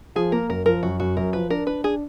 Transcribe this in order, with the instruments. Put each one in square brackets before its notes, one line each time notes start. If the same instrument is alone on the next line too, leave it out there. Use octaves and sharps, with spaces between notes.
[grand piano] F3 [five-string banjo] G#4
[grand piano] A#3 [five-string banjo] A#4
[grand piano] F#2 [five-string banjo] A#4
[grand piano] F3 [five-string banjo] A#4
[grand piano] F#2 [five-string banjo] F#4
[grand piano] F#2 [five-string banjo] F#4
[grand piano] F#2 [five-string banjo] A#4
[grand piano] F3 [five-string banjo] B4
[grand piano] D4 [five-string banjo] A#4
[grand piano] D4 [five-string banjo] B4
[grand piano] D4 [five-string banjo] G#4